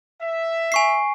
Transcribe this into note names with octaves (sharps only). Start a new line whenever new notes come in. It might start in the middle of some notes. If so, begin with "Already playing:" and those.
E5
G#5 C#6 C7